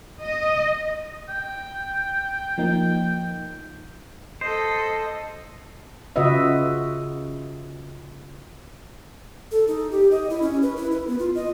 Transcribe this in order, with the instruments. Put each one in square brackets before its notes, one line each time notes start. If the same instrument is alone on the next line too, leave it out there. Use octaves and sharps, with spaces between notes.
[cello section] D#5
[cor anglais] G5
[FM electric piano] F3 A#3 D#4
[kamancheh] A4 D#5 [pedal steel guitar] C5
[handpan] C#3 F4 F#4 B4 D#5 E5
[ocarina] A4
D#4
G4
D#5
E4
C#4
B4
E4
B4
B3
F4
D#5